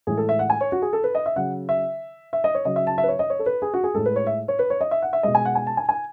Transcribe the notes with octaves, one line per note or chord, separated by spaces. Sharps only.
A2 E3 G#3 G#4
A4
E5
F#5
G#5
C#5
F#4
G#4
A4
B4
D#5
E5
C#3 F#3 F#5
E5
E5
D#5
C#5
C#3 F#3 D#5
E5
A5
E5
B4
C#5
D#5
C#5
A4
B4
G#4
F#4
G#4
A2 G#3 A4
B4
C#5
E5
C#5
B4
C#5
D#5
E5
F#5
E5
B2 G#3 D#5
G#5
F#5
G#5
A5
G#5
G#5